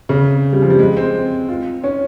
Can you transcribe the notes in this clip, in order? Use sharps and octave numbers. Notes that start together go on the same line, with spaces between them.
C#3
G3
F3
G3
G#3
C4
F4
C#4